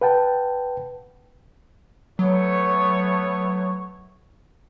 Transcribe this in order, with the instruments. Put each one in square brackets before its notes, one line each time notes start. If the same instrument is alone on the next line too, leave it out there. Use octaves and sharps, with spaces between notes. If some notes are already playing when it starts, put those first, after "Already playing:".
[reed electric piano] B4 F#5 G5 A5
[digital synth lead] F#3 [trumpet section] A3 B3 C#5